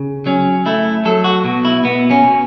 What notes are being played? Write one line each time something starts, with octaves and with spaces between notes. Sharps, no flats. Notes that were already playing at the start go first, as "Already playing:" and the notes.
Already playing: C#3
F#3 C#4
A3 E4
F#3 A4
F#4
B2
E4
B2 B3
C#4
B2